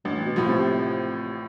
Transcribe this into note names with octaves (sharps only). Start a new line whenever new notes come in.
A1 G2
B2
A2 F3
C3